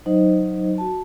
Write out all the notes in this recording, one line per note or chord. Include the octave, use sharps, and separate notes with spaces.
F#3 D#4 C5 D#5
F#4 A5